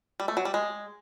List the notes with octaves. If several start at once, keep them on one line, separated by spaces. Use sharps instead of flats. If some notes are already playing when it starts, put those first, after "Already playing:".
G3
A3
F#3
G3
G#3